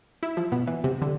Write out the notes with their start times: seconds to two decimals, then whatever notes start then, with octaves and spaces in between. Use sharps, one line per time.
0.23 E4
0.37 F3
0.52 B2
0.67 E3
0.84 C3
1.02 D3